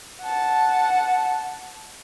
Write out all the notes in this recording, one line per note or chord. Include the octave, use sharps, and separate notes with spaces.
F#5 A5